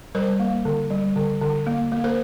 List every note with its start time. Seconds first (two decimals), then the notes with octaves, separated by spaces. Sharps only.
0.15 G3 A#4 C5
0.40 A#3
0.65 D3
0.90 G3
1.16 D3
1.41 D3
1.67 A#3
1.92 A#3
2.04 A#4 C5